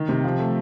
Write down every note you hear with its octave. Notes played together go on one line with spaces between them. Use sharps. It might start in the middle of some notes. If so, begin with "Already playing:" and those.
Already playing: D#3
C3
F3
A3